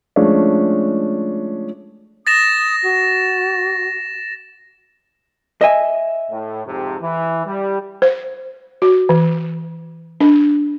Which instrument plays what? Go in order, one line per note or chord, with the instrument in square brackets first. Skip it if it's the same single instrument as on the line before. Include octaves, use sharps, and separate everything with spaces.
[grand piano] F3 G#3 A3 C#4 D4
[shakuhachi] D#6 [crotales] A6 A#6 E7
[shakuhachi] F#4
[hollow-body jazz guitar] D#5 E5 G#5
[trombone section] A2
F2 G#2 C3
E3
G3
[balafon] C5
F#4
E3
D4